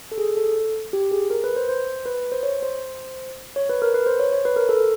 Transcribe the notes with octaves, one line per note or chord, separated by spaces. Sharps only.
A4
G#4
A4
G4
G#4
A#4
B4
C5
C5
B4
C5
C#5
C5
C#5
B4
A#4
B4
C5
C#5
C#5
B4
A#4
A4